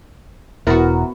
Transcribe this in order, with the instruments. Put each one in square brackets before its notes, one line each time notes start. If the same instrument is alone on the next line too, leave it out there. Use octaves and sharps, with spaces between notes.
[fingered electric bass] E1 [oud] B3 F#4 [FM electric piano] E4 A#4